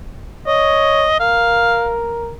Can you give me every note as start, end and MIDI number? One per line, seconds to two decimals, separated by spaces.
0.47 1.11 73
0.47 1.19 75
1.20 2.36 70
1.20 1.92 77